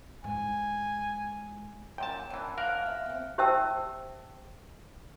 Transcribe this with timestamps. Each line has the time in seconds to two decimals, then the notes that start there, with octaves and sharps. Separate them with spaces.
0.24 G#2 G#5
1.98 F#2 A#2 G5 A5
2.30 F#2 E3 D4
2.58 G#2 A#4 F5 F6 F#6
2.86 E5
3.06 C4 F#5
3.38 G4 C5 E5 G5 A5 E6